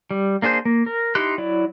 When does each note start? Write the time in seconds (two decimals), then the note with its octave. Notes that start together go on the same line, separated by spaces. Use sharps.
0.11 G3
0.42 A#3 D4 G#4 C5 G6
0.65 A#3
0.86 A#4
1.15 D#4 E4 G4 C6 F#6
1.38 F#3 E4 D5